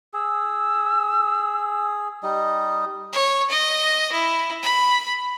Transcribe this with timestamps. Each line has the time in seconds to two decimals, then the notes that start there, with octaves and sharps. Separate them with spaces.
0.14 G#4 E6
2.23 G3 D#4 D#5
3.13 C#5
3.50 D#5
4.12 E4
4.63 B5